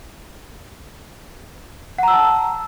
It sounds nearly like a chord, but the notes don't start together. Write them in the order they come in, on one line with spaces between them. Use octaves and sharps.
F#5 A#5 E6 A5